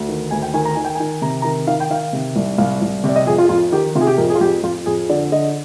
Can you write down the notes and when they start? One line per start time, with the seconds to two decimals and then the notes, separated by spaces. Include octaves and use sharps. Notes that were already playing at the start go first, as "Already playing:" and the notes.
Already playing: D2
0.09 D#3
0.31 D2 G#5
0.42 G5
0.54 D#3 G#5
0.65 A#5
0.75 D#3 G#5
0.85 G5
0.95 G#5
1.00 D#3
1.22 C3 A#5
1.42 D#3 A#5
1.67 D#3 F5
1.80 G5
1.90 D#3 F5
2.13 C3
2.36 C2
2.58 C2 F5
2.82 C2
3.04 C3 D5
3.16 D#5
3.27 F2 G#4
3.38 F4
3.49 F2 F4
3.72 D#3 G4
3.95 C3 F4
4.01 G#4
4.07 G4
4.18 F2 A#4
4.30 G#4
4.35 F4
4.41 F2 G4
4.63 F2 F4
4.86 F2 G#4
5.10 D3 D5
5.32 D3 D#5